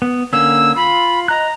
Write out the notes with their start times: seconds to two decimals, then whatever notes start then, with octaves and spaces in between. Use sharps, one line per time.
0.02 B3
0.33 D3 A#3 C#4 E6
0.76 F4 B5
1.28 D#5 A#5 F#6